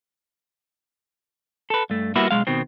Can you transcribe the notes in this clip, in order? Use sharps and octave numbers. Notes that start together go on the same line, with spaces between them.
A4 B4
G2 A3
G3 A#3 B3 E4 F#4
B1 G#3 F5
B2 D#3 C4